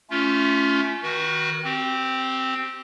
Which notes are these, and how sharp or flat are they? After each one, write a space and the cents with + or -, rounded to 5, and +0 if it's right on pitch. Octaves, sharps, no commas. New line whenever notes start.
A3 +0 C#4 +20 F4 -15
D#3 +0 F#4 +0 B4 -40
C4 +0 G4 -30